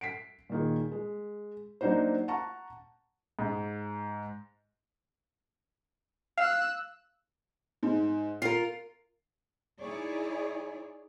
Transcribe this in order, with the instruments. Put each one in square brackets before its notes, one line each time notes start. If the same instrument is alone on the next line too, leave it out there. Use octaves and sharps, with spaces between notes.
[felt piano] B6 C7 D7
A#2 D#3 G#4
G#3
F#3 A#3 D4 D#4 F#4 C5
F#5 A5 A#5 C#6
[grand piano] G#2
[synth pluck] F5 [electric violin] E6 F#6
[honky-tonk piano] G#2
[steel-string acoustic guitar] F4 A#4 [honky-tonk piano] C7
[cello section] D#4 E4 G#4 C#5 D5